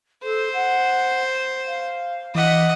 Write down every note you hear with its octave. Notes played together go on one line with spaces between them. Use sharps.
A4 C5
F#5
F5
E3 D#5 F#5 D6 B6